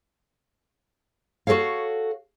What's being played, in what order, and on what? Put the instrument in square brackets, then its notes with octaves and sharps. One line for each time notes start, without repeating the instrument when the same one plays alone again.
[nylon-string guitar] F#4 G4 A4 C#5 F5